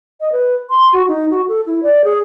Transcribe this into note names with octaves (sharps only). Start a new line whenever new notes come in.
D#5
B4
C6
F#4
D#4
F#4
A4
E4
D5
G#4